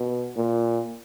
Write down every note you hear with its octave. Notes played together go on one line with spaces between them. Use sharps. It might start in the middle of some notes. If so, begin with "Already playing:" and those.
Already playing: B2
A#2